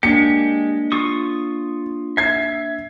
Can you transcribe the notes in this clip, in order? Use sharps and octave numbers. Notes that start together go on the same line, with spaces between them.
G#3 A#3 D4 G4 C#7
F4 C#6 D#6
E5 G#6 C7